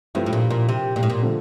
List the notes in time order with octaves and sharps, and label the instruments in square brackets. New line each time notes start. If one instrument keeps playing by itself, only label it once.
[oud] G2 [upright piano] F3 A3 E4
[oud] A2
A#2
A#2
C3
A#2
A2
A#2
[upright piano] D3 F3 A3